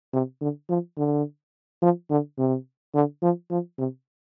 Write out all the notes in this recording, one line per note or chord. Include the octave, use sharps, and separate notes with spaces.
C3
D3
F3
D3
F3
D3
C3
D3
F3
F3
C3